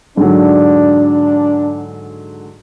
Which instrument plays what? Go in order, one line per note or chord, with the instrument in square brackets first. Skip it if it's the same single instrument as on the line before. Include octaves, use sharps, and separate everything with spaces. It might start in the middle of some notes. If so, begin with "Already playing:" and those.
[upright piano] G#2 D3 F#3 [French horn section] D4